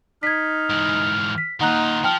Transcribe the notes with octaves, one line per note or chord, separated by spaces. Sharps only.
D#4 F6 G#6 B6
G#2 E3
B6
D#3 A#3 D#4 F4 F#5 A#5 F#6
F3 G5 A5 F6